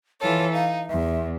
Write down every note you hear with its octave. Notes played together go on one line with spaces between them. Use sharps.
E3 F4 A4 C#5
D#4 F5
E2 E5